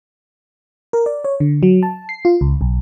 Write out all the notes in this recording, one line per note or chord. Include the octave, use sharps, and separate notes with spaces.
A#4
D5
C#5
D3
F#3
A5
C7
F4
C#2
B1